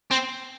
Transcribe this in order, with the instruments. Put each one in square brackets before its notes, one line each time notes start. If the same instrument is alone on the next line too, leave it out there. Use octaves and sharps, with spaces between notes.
[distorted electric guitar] C4